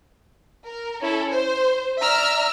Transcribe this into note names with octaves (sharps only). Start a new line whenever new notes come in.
A#4
C#4 E4 A4
C5
D5 E5 A#5 E6 F6